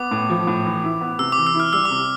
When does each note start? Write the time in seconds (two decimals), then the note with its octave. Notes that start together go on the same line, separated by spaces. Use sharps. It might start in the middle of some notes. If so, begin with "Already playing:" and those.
Already playing: B3 D6
0.11 A2
0.30 F3
0.47 A2
0.66 E3
0.84 E4
1.01 B3
1.19 C3 E6
1.32 D6
1.38 E3
1.47 E6
1.55 E4
1.60 F6
1.73 G3 E6
1.85 D6
1.91 C3